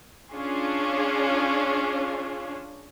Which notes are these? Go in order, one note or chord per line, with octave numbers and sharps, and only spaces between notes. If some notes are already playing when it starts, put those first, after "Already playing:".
C#4 D4 F4 G#4